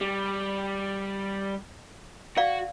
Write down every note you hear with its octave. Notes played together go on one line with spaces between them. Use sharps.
G3
F#4 D5 F5